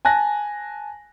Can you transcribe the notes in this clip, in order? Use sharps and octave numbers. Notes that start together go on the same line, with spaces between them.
G#5 A5 F#6 A#6